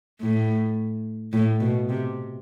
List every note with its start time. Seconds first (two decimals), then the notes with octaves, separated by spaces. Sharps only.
0.21 A2
1.33 A2
1.60 B2
1.89 C3